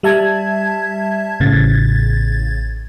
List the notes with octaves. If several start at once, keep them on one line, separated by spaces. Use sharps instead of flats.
G3 E5 A5 G#6
A1 A2 C#3 G#6 A6